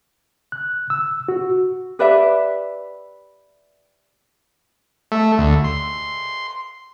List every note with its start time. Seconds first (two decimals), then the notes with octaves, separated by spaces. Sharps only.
0.52 F#6
0.90 E6
1.28 F#4
1.99 G4 B4 D5 E5
5.12 A3
5.38 D2
5.64 C6